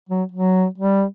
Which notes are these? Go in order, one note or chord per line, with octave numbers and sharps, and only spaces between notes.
F#3
F#3
G3